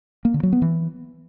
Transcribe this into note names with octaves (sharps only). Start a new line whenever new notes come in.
A#3
D3
F#3
B3
E3